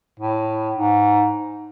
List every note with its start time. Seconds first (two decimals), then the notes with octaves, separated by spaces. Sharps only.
0.20 A2
0.75 G#2